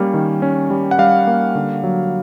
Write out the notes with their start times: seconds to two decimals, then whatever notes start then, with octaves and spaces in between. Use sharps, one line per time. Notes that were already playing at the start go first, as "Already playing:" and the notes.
Already playing: G3 A#3 C#4
0.14 D#3
0.42 C#4
0.70 G3
0.91 F#5
0.99 G3 F5
1.27 A#3
1.55 D3
1.83 F#3